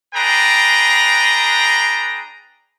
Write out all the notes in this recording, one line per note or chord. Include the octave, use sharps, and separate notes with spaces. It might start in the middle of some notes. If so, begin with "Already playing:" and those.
D4 G#4 B4 G5 A#5